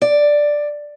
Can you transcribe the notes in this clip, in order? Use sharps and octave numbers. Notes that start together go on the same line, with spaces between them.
D5